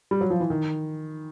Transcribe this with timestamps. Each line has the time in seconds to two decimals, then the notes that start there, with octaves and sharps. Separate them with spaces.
0.11 G3
0.21 F#3
0.30 F3
0.40 E3
0.50 D#3